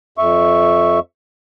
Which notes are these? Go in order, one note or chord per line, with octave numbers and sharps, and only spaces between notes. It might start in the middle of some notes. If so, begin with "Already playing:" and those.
F2 E5 C#6